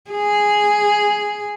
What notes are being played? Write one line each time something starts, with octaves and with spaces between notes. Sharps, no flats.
G#4